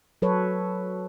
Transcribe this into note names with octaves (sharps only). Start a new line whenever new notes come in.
F#3 A4 B4 C#5